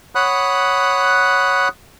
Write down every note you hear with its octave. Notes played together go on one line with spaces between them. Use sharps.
C#5 F#5 B5 D#6 F#6